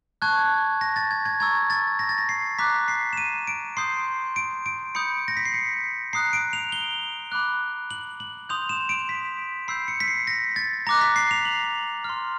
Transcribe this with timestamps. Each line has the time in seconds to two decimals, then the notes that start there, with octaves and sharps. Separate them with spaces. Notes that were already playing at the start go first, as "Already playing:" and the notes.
0.22 A5 C#6 F#6 G#6
0.81 A#6
0.96 A6
1.11 G#6
1.25 G#6
1.40 A#5 C#6 E6 G#6
1.70 A6
1.99 A#6
2.09 A6
2.18 A#6
2.29 C7
2.59 A#5 D6 F#6 B6
2.88 C7
3.13 E7
3.17 D#7
3.47 D7
3.77 C6 D#6 G6 C7
4.36 D7
4.66 D7
4.95 B5 D#6 G6 C#7
5.28 A#6
5.37 B6
5.45 C7
5.54 C#7
6.13 A#5 D#6 F#6 C7
6.33 D7
6.53 F7
6.72 G7
7.32 B5 D6 F#6
7.91 F#7
8.20 F#7
8.49 C6 D#6 G6 F7
8.69 E7
8.89 D7
9.09 B6
9.68 B5 E6 G6 C7
9.88 C#7
10.00 B6
10.08 C7
10.27 A#6
10.56 A6
10.87 A#5 D6 F#6 A#6
11.01 B6
11.16 C7
11.31 F7
11.45 F#7
12.04 C6 F6